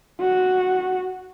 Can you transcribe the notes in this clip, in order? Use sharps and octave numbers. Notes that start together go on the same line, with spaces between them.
F#4